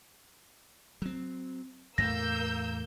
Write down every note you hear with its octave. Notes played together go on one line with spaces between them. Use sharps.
F#3 C4
E2 A2 A3 A#3 E6 G6 A#6